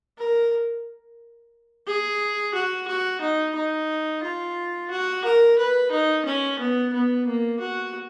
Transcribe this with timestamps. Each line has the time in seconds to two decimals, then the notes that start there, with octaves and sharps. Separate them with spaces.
0.18 A#4
1.87 G#4
2.54 F#4
2.88 F#4
3.21 D#4
3.55 D#4
4.23 F4
4.90 F#4
5.24 A#4
5.58 B4
5.91 D#4
6.25 C#4
6.59 B3
6.93 B3
7.27 A#3
7.60 F#4